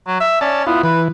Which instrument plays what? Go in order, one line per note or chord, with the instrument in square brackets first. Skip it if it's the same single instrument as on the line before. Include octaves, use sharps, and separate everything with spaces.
[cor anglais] F#3
E5
[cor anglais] C#4 [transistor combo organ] D5 A5
[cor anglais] B3 [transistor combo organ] E4 F4
[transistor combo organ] E3 [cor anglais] B4